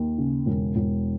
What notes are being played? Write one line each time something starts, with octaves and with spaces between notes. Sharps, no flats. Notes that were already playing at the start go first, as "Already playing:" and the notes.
Already playing: D#2
C#3
E1
E1